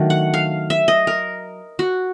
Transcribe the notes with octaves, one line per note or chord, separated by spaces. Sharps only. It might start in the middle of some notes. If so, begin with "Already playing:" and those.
Already playing: D#3 F#3 A3 D4
F#5
F5
E5
D#5
A#4
F#4